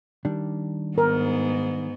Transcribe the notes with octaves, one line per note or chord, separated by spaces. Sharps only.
D#3 G3 D4
G#2 B3 A#4